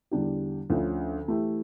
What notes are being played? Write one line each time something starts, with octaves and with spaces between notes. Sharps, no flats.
E2 D3 G3 D4 G4
D2 D3 F3 C#4
E3 A3 E4 G4